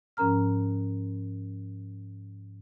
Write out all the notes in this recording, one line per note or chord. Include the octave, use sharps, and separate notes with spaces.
G#2 F3 C#4 A#4 A#5 F6